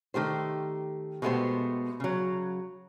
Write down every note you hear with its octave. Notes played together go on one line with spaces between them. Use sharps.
D#3 A3 G4 C5
B2 G#3 A3 B3 G4 C5
C#3 F#3